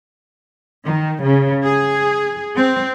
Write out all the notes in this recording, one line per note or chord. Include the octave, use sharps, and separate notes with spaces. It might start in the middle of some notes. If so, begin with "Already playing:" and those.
D#3
C#3
G#4
C4